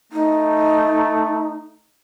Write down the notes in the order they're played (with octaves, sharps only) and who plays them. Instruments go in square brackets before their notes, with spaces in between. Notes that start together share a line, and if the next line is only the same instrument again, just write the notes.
[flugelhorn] A3 [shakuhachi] D#4